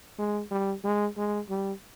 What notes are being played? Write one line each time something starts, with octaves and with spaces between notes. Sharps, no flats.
G#3
G3
G#3
G#3
G3